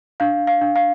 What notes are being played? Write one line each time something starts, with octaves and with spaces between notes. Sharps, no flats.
D4 F5
F5
D4
F5